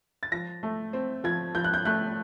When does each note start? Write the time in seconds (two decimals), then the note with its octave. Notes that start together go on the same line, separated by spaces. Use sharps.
0.23 A6
0.32 F3 A#6
0.63 A3
0.93 C4
1.24 F3 G#6
1.55 F3 G6
1.64 F#6
1.74 G6
1.85 A3 F#6